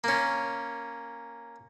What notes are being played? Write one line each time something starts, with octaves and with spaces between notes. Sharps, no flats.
A#3 C#4